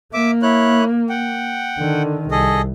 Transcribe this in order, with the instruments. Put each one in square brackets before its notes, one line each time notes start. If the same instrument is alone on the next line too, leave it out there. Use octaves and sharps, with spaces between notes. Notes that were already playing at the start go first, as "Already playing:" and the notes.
[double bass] A#3 [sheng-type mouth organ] E5 D6
[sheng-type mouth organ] E4 C#5 F#6
F#5 G5
[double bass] D3 D#3
[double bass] C2 [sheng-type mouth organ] G#4 A4 D#5